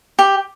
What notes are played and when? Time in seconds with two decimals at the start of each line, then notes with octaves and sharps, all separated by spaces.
0.19 G4